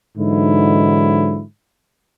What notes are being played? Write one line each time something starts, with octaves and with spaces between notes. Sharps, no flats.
G#2 D3 E3 F#3 D#4 E4